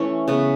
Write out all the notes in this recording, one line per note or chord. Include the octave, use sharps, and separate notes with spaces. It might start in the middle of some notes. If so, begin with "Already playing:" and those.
Already playing: E3 A3 C#4 C#5
C#3 B3 B4